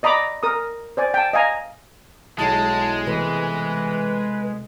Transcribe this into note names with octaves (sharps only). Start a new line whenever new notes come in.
D5 D#5 A#5 B5 D6
A#4 D#6
C5 D5 G#5
G5 A5
D#5 F5 G#5 A#5
B1 G#3 E4 A5 G6
C3 E3 A3 B4 C5